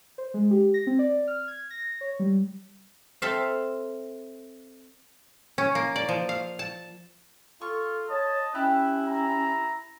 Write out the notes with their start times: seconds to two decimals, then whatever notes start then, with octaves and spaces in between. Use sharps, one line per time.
0.18 C5
0.34 G#3
0.51 G4
0.74 A#6
0.87 C4
0.99 D5
1.27 F6
1.48 G#6
1.70 A#6
2.01 C#5
2.19 G3
3.22 C4 A4 C5 E5 F5
5.58 C#4
5.75 A#3
5.96 D5
6.09 F3
6.29 F5
6.59 A5
7.61 F4 A4 C#6
8.10 C#5 D#5 A5
8.55 C#4 E4 G4 E5 B5 F#6
9.07 A#5